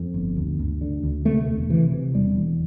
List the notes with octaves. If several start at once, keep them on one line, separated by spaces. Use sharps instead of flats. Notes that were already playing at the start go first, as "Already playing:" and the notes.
Already playing: F2
G1
D2
D2
D3
D2
C3 A3
E1
C3 E3
C3
E1 G3
E2